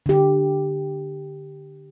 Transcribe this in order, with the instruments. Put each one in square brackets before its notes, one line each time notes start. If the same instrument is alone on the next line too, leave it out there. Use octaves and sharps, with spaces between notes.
[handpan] D3 G4